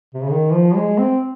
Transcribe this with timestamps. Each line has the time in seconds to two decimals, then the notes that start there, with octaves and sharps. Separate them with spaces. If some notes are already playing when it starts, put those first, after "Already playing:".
0.14 C3
0.23 C#3
0.31 D#3
0.53 F3
0.76 G#3
0.99 C4